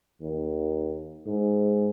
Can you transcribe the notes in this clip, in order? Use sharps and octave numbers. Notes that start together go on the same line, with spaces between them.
D#2
G#2